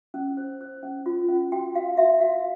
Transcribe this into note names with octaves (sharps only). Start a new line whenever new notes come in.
C#4
C5
C5
C#4
F4
C#4
F#4 G5
F#4 F5
F#4 E5
F#4 F5